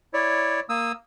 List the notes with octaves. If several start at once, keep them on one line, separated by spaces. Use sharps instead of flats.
E4 C#5 D5
A#3 D#6 E6